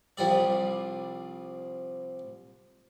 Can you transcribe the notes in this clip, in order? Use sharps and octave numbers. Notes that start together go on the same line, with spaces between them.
C2 F3 G3 D5